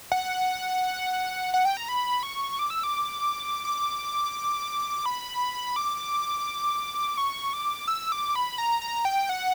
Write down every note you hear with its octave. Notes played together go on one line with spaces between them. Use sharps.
F#5
F#5
G5
A#5
B5
C#6
D6
E6
D6
D6
B5
D6
C#6
D6
E6
D6
B5
A#5
A#5
G5
F#5